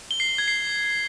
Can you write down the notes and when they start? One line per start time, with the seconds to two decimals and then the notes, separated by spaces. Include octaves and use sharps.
0.11 G7
0.20 C7
0.29 G7
0.38 G#6
0.48 C7